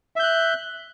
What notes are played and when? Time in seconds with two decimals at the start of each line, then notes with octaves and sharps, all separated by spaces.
0.16 E5
0.20 G6
0.23 F#6